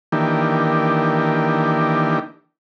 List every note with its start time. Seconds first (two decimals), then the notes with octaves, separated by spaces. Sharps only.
0.12 D#3 E3 A#3 D4 G4